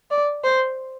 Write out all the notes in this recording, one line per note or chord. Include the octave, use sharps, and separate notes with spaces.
D5
C5